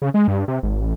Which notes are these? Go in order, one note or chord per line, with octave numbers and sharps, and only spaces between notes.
C#3
G#3
G2
C3
G#1
A1